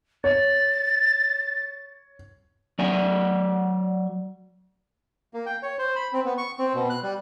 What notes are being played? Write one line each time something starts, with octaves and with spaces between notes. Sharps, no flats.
C#5 A6
F#3 D5 G#5
A#3
G5
C#5
C5
B5
C4
B3
C#6
C4
B2
F#6
G3